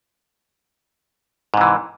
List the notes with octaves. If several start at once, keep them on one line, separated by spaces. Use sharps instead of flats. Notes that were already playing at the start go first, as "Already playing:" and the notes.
G#2 C3 E3